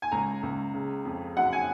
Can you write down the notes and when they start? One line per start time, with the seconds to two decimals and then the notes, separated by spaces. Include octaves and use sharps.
0.02 G#5
0.12 C#2 A#5
0.43 C#2
0.74 C#3
1.05 F2
1.37 F#2 F#5
1.53 G#5